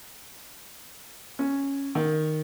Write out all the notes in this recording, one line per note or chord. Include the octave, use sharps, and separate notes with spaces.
C#4
D#3